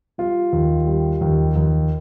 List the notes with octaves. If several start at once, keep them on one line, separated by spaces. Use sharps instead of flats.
G3 F4
D#2
G3
D#2
D#2